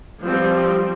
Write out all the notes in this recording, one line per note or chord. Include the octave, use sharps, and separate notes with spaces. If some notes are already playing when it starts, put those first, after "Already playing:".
F3 G3 C4